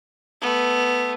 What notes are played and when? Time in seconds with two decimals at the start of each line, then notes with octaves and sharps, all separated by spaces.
0.42 A3 B3